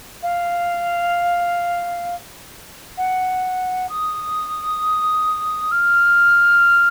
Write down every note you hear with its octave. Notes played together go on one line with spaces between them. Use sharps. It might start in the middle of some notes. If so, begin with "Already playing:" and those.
F5
F#5
D#6
F6